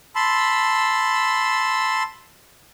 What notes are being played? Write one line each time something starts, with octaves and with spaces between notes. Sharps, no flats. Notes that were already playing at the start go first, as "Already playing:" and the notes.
A5 B5 C6 E6